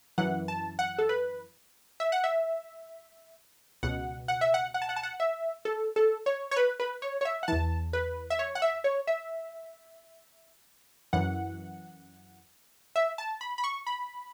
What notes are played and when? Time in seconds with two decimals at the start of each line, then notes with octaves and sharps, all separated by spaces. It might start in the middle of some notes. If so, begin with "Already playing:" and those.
0.18 F#2 E3 F#5
0.48 A5
0.79 F#5
0.98 A4
1.09 B4
2.00 E5
2.12 F#5
2.24 E5
3.83 C#2 B2 F#5
4.28 F#5
4.41 E5
4.54 F#5
4.74 F#5
4.82 A5
4.89 F#5
4.96 A5
5.03 F#5
5.20 E5
5.65 A4
5.96 A4
6.26 C#5
6.51 C#5
6.56 B4
6.80 B4
7.02 C#5
7.21 C#5
7.25 E5
7.43 F#5
7.48 E2 E3 A5
7.93 B4
8.30 E5
8.39 C#5
8.55 F#5
8.62 E5
8.84 C#5
9.07 E5
11.13 F#2 E3 F#5
12.96 E5
13.18 A5
13.41 B5
13.58 B5
13.64 C#6
13.87 B5